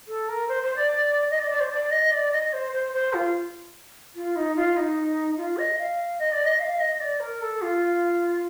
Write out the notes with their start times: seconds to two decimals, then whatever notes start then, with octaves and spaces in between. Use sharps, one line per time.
0.07 A4
0.29 A#4
0.48 C5
0.62 C5
0.75 D5
1.30 D#5
1.40 D5
1.50 D5
1.60 C5
1.70 D5
1.91 D#5
2.11 D5
2.31 D#5
2.53 C5
2.72 C5
2.93 C5
3.13 F4
4.15 F4
4.36 D#4
4.56 F4
4.76 D#4
5.37 F4
5.57 D#5
5.78 F5
6.19 D#5
6.32 D5
6.45 D#5
6.60 F5
6.79 D#5
7.00 D5
7.20 A#4
7.41 A4
7.61 F4